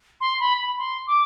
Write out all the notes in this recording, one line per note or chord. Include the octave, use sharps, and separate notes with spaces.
C6
B5
B5
C6
D6